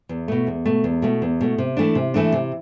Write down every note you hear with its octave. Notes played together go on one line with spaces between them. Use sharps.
E2
B2 A3
E2
B2 A3
E2
B2 A3
E2
B2 A3
C3
E3 A3 D4
C3
E3 A3 D4
C3